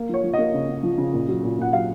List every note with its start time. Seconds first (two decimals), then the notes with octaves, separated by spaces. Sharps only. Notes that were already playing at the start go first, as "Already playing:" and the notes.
Already playing: A#3
0.09 F3 C#5
0.24 F3
0.33 D#5
0.38 A#3
0.54 C#3
0.68 C#3
0.83 F3
0.98 C#3
1.14 A#2
1.28 F#3
1.43 A#2
1.58 A#2 F#5
1.73 F#3 F5